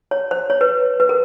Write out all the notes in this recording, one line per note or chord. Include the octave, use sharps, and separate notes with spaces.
C#5
C5
C#5
B4
B4
A#4